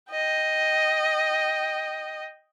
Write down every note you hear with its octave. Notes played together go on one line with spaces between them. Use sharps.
D#5 G5